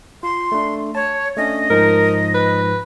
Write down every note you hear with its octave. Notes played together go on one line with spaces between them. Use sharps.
F4 C6
A3 D4
C#5 A5
A3 C#4 D4 D#5
G#2 F3 D#4 A#4
B4